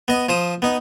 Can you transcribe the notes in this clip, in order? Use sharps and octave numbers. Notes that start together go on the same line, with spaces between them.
B3 D#5
F3 C5 D#6
B3 D#4